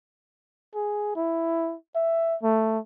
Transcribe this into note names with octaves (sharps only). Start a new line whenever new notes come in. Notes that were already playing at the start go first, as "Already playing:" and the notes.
G#4
E4
E5
A3